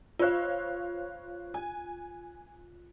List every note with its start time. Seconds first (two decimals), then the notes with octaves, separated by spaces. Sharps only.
0.19 F4 C5 C#5 F5 F#6
1.54 G#5